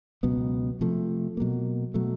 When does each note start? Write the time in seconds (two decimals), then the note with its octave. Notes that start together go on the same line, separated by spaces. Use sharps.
0.23 C#2 B2 F#3 B3
0.81 C3 F3 A3
1.37 B2 F#3 A#3
1.94 B2 F#3 A3